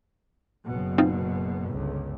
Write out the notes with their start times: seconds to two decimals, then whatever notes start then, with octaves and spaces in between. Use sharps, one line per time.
0.66 F#1 B2
0.98 C4 D#4 F4
1.68 G1 C#2